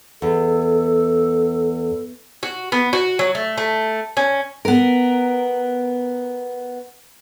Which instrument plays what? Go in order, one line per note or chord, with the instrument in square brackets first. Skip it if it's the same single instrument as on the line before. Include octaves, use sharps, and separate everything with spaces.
[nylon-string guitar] E2 [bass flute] A4
[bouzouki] F#4
B3
F#4
F#3
A3
A3
C#4
[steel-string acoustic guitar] B3 A#4